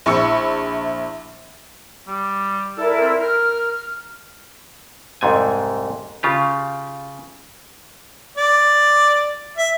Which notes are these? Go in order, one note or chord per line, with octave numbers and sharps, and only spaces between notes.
A#1 E4 B5 C#6 E6 C#7
G3
E4 A4 A#4 D5
C4
A#4 F6
C2 F2 G#2 A3 G#5
C#3 F4 G4
D5
E5